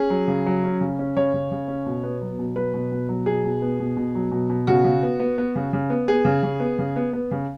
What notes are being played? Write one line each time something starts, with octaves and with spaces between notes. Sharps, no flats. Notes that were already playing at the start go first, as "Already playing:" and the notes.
Already playing: C#4 G#4
F#3
C#3
F#3
C#4
C#3
C#4
C#3 C#5
C#3
C#3
C#4
B2
B3
F#3
B2
F#3 B4
B2
B2
F#3
B2 G#4
B2
B3
B2
B2
F#3
B2
B2
C#3 F#4
C#3
B3
B3
B3
C#3
C#3
B3
B3 G#4
C#3
C#3
B3
C#3
B3
B3
C#3